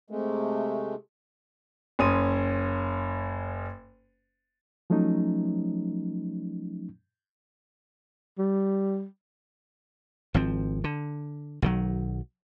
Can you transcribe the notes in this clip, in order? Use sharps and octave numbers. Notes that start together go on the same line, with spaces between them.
C3 G#3 A3
F#1 C#4 C6 D#6 D#7
F3 F#3 A3 C#4 D#4
G3
G#1 F3 C4
D3
B1 D#3 F#3